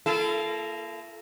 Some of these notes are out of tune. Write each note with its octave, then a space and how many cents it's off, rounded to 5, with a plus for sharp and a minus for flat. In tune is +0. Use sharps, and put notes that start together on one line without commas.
A#3 -5 E4 +45 A4 -25